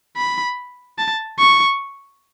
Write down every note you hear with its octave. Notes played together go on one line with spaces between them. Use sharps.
B5
A5
C#6